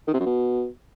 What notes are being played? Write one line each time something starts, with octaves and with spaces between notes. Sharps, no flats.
D#3
C3
F#2
B2